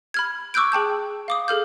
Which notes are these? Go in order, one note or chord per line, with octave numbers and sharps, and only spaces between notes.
B5 F6 G#6
C#6 D6 E6 F#6 G6 D7
G#4 G5 A5 G6
F5 D6 D#6
G#4 A4 F6 G6